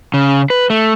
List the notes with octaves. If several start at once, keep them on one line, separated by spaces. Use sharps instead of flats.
C#3
B4
A3